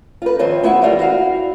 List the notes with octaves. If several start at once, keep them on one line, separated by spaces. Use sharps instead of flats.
F4 B4
D#3 F3 C4 F4 C#5
A3 B3 E4 F#4 E5 F#5
E3 F3 G3 A#3 F4
E4 F#4 F5